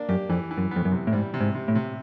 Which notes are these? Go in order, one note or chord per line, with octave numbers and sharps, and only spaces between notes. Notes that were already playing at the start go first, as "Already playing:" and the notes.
Already playing: A#3 D4
F#2 G4
F2 E3
E3
F#2
F2 B3
F#2
C3
A2
G#2 G3
C3
G#2
C3
A2
C3